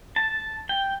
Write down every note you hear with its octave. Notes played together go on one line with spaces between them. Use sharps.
A5
G5